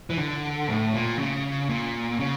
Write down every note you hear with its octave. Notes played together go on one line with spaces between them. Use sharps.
E3
D3
A2
A#2
C#3
A#2
C#3